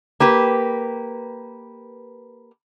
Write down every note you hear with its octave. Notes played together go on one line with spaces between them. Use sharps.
A#3 G4 B4